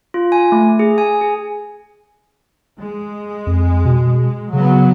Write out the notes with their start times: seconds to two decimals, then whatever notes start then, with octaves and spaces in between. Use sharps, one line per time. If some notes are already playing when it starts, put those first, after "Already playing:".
0.14 F4
0.32 G#5
0.52 A3
0.79 G#4
0.98 G#5
1.21 G#4
2.79 G#3
3.47 F2
3.85 B2
4.53 C#3 F#3 B3